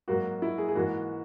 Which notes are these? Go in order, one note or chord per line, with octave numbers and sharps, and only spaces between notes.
G#2 F#3 A#3 F#4
E4
G#4
G#4
G#2 E3 A#3 F#4